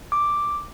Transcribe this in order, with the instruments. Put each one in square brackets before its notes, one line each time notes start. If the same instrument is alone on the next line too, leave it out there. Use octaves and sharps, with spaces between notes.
[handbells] D6